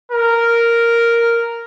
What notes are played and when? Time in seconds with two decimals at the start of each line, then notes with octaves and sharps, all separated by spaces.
0.12 A#4